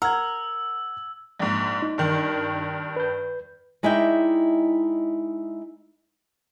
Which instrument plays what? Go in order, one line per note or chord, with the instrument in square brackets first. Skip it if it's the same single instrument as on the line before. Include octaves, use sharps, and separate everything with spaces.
[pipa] A#4 [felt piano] F#5 G#6 [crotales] E6
[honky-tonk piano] A#1 G#2
[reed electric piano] D#4
[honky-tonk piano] G2 D#3
[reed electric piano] B4 G6
[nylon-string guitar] G#3 D#4 E4 D5 E5 G5